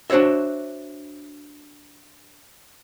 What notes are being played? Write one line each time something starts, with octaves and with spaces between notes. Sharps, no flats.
D4 F#4 C5 C#5 E5